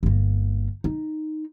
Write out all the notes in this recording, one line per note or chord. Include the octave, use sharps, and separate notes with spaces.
G1 A#3
D#4